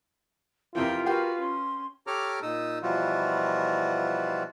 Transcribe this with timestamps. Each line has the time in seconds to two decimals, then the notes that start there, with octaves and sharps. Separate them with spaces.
0.75 F2 C3 E3 F4 A#4 E5 G5
1.06 F#4 G4 A#4 B4 F5 G5
1.40 C#4 C6
2.07 G4 A4 C#5 A#5 D6 F6
2.42 A#2 D#4 D#6 E6
2.82 B2 E3 F3 G3 F4 F#4